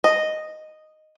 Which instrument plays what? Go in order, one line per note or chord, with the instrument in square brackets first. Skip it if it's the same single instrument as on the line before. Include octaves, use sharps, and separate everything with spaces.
[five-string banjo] D#5